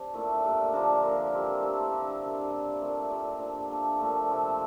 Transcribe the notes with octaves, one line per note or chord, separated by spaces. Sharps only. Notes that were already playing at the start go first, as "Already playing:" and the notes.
Already playing: C4 D4 G4
A#2 A3 E4
A2 G3 A#3
D3 F3 A#3 D4
A#2 F3 A#3
E3 G3 C4 G4
A3 E4 A4 C5
D3 G3 D4
C3 G3 A#3 D4
G3 C4 E4
A#2 A3 C4 G4
A#2 G3 C4
F3 A#3 D4
A3 D4 A4
A#2 F3 A3
C3 F3 C4